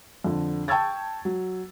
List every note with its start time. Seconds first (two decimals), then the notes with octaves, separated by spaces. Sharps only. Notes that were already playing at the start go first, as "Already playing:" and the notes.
0.24 F2 D3
0.68 G5 A5 C#6 E6 G#6 A6
1.25 F#3